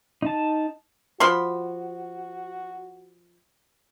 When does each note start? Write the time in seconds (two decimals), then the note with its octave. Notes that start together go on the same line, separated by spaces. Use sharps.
0.22 D#4 A5
1.20 F3 F#4 B5 C6